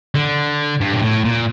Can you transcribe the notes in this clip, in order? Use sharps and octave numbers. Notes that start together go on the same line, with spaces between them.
D3
G2
A#2
A2
A#2